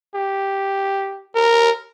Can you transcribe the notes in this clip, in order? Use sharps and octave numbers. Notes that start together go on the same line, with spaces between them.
G4
A#4